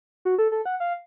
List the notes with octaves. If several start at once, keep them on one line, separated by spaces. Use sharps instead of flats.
F#4
A4
A4
F#5
F5